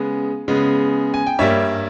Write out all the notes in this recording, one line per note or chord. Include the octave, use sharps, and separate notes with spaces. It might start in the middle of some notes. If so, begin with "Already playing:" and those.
Already playing: C#3 G#3 B3
C#3 G#3 B3
G#5
G5
G2 G3 A#3 C#5 E5